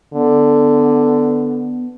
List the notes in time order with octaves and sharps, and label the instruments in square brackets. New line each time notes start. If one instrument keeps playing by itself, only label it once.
[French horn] D3 [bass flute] B3